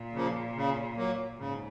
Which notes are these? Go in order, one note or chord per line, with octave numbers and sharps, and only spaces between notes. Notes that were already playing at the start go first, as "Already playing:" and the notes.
Already playing: A#2
C#3 F3 A#3
C#3
F#3 A#3
G#2 C#3